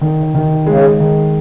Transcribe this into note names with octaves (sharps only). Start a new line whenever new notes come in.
D3 D#3
C#3
C3 D#3
C3
C#3 G#3
D#3